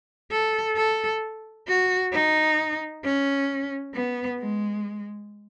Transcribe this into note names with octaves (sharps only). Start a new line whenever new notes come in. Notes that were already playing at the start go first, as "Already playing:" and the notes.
A4
A4
F#4
D#4
C#4
B3
G#3